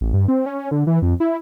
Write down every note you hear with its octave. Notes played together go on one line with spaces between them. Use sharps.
A1
G2
C4
C#4
D3
E3
F2
E4